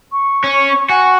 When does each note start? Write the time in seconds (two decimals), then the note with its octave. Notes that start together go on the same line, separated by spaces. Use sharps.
0.12 C#6
0.44 C#4
0.89 F#4 G#5